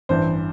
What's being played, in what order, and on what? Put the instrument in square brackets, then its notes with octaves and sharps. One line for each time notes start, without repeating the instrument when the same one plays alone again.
[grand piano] A1 G2 E3 C5